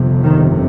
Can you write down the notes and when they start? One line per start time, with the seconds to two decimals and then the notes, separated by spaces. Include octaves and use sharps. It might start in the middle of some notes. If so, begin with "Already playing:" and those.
Already playing: G1 F2 C3
0.22 D#3